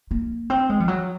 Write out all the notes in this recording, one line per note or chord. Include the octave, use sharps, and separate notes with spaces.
A#3
C4
G#3
F3
F#3